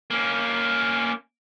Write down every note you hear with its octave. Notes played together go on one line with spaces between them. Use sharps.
A#3 C#4